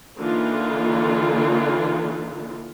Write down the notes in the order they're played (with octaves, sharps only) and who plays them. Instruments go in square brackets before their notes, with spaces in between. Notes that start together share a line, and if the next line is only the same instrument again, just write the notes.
[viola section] D3 E3 A#3 D#4 F4